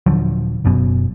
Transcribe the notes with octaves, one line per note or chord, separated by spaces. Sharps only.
D#1 D3 F3 F#3
F#1 F#2 B2